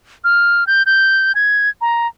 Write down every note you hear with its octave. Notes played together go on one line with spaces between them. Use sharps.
F6
G6
G6
G#6
A#5